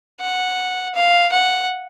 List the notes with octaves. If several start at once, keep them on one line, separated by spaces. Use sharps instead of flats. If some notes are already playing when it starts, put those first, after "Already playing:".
F#5
F5
F#5